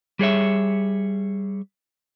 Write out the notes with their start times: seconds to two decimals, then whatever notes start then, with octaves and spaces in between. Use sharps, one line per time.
0.19 G3 G#4 C#5 E5